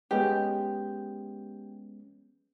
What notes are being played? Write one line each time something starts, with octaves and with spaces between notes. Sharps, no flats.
G#3 B3 C#4 G4